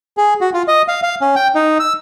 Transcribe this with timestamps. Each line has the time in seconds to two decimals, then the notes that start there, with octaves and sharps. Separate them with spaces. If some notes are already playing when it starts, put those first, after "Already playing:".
0.17 G#4
0.41 F#4
0.54 F4
0.68 D#5
0.88 F5
1.03 F5
1.21 C#4
1.36 G5
1.55 D#4
1.80 E6